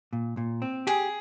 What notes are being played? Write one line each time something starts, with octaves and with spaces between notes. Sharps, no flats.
A#2
A#2
C4
G4 G#4